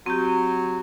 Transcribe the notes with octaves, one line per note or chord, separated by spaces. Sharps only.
F#3 C4 G4